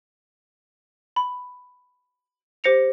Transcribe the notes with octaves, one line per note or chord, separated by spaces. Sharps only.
B5
G4 C5 A#6 C#7 F7